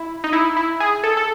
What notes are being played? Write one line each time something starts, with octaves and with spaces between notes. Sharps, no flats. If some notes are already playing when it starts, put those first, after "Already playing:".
Already playing: E4
D#4
E4
E4
G#4
A4
A4